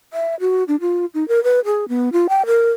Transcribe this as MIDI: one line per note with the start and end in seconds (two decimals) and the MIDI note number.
0.13 0.35 76
0.40 0.64 66
0.68 0.76 62
0.81 1.05 65
1.14 1.27 63
1.28 1.43 70
1.44 1.60 71
1.65 1.88 68
1.89 2.09 59
2.13 2.27 65
2.29 2.46 79
2.46 2.71 70